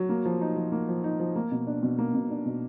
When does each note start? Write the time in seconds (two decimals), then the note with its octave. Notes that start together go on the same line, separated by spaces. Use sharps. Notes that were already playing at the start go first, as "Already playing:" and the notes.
Already playing: F#3
0.09 A#3
0.25 F3
0.41 D#4
0.56 F3
0.72 A#3
0.89 F3
1.04 D#4
1.20 F3
1.36 A#3
1.51 B2
1.67 D4
1.83 B2
1.98 A#3
2.14 B2
2.30 D4
2.46 B2